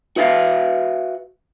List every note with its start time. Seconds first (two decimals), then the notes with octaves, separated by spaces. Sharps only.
0.16 F#4 B4 E5 F5